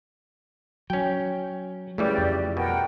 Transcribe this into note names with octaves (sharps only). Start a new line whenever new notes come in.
F#3 C#4 G5
C#3 E3 G3 A3 G4 D5
F2
B2 A#4 F#5 G5